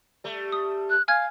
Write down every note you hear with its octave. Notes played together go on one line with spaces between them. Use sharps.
G3 A3
D#6
F#6
F5 G#5 F6 G#6